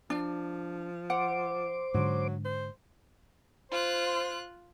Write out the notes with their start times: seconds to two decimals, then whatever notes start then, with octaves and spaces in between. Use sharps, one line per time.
0.10 F3 D4
1.10 C5 F#5 D6
1.94 G#2 D3 F#3
2.45 C5
3.72 F4 C5 F#6